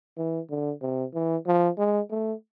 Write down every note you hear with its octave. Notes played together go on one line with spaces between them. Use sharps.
E3
D3
C3
E3
F3
G#3
A3